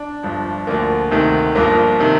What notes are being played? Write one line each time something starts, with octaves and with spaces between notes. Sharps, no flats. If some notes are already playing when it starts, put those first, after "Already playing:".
Already playing: D4
G1 G2 F3
D2 D3 F3 A#3
D2 C3 D#3
G1 G2 F3 A#3
C3 D#3